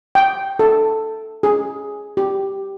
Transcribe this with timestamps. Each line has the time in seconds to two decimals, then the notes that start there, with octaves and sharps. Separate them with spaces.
0.15 G5
0.59 A4
1.43 G#4
2.17 G4